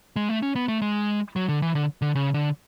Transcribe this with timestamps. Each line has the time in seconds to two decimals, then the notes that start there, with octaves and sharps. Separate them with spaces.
0.16 G#3
0.29 A3
0.43 C#4
0.55 B3
0.68 A3
0.82 G#3
1.36 F#3
1.49 D3
1.62 E3
1.75 D3
2.02 D3
2.15 C#3
2.34 D3